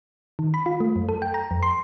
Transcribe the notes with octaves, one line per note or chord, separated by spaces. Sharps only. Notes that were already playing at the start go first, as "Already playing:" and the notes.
D#3
B5
F4
A3
F#2
A4
G5
A#5
F2
C6